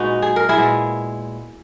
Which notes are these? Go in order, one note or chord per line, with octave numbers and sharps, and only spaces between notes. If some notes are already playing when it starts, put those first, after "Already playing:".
Already playing: A#2 G#3 B3 D#4 F#4
G#4
A#4
E4 G#4
A#2 G#3 B3